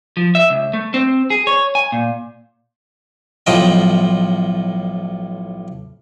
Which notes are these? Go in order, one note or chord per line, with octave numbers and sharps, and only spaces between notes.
F3
E5
C#2
A3
C4
G#4
C#5
G#5
A#2
B1 A2 F3 F4 D#5 G5